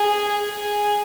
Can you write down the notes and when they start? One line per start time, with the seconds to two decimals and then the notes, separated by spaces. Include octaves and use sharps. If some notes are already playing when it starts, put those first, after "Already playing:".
Already playing: G#4
0.48 G#4